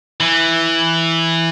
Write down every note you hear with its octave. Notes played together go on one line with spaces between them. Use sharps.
E3